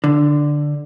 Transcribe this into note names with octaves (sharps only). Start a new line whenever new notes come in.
D3